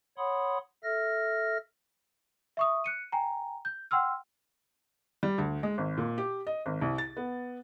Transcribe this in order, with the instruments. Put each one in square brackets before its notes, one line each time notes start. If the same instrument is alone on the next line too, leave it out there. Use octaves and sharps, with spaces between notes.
[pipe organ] C#5 F#5 B5 C6 D#6
A4 E5 F6 A#6
[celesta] E5 C#6 D#6
F#6 C#7 D#7
G5 G#5 A#5
G6
F#5 G5 C6 E6 F6
[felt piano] G3
D2
G#3
G#1
A#2
G4
D#5
G#1
C2
A6
B3